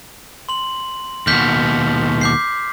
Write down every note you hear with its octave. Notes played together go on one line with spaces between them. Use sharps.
C6 F#7
D#2 B2 F6 G6 B6
D6 G6 C7